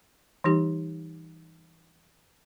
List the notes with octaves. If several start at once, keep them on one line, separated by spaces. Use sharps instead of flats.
E3 G3 D#4 G4